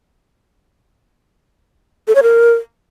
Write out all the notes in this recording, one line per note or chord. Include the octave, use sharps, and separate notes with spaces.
A4
C#5
A#4